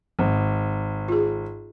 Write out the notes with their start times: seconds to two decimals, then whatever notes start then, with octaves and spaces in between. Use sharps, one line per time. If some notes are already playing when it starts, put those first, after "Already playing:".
0.19 G#1
1.08 F4 G#4